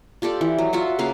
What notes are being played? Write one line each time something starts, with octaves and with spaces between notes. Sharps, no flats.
F4 G4 A4 D5
E3
F#3
F4 F#4 E5 F#5
C#3 A#3 B4 F5